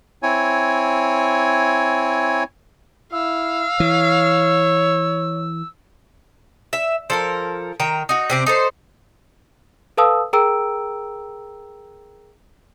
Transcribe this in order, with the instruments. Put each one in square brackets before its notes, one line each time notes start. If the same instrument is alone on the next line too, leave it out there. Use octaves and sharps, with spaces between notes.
[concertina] C4 E4 C#5 G#5
[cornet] E4 [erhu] F5 [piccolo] E6
[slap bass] E3 [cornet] C#5
[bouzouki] E5
F3 A4 A#4
D#3 G5 A#5
D#4 F#4
C3 C4 G4
D#4 A4 C5
[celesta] A4 B4 F5 A5 D#6 E6
G#4 A#4 G5 A#5 E6 D7